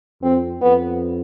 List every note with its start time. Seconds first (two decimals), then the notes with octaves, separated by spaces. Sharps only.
0.22 F2 C4
0.61 F2 B3